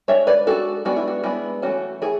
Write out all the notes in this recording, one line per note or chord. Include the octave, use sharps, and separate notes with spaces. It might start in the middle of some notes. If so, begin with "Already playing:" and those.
G#3 D4 C#5 E5
B4 D5
G#3 D4 F#4 A4
G#3 B3 D4 F#4
E4
F#4
G#3 B3 D4 E4
E3 A3 C#4 F#4
E3 A3 E4 G#4